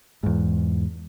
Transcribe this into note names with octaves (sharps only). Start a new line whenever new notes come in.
E2 G#2